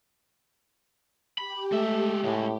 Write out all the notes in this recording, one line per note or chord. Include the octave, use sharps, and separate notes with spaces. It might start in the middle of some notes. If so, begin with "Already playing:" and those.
G4 B5
G#3 A3 E5
A2 G#3 C#4